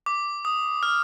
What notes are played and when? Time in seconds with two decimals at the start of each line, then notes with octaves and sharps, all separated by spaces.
0.06 D6
0.45 D#6
0.83 F6